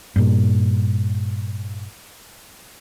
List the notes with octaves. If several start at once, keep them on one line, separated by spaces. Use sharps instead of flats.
G2 A#2